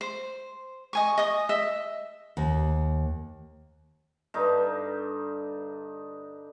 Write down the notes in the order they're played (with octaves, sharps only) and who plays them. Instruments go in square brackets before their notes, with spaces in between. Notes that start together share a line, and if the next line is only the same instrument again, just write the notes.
[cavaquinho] C5
D#5 G#5 C#6
D#5 D#6
D#5 E5
[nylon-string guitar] D#2
[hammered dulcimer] G2 D3 D#4